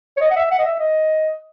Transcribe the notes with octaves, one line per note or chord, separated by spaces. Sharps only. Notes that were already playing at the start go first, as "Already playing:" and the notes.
C#5
D#5
F#5
E5
F#5
D#5
E5
D#5